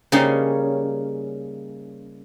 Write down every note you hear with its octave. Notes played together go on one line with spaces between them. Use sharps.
C#3 G3 A#3 C#4 D#4